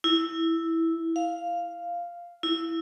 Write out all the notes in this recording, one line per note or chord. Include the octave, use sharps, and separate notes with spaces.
E4
F5
E4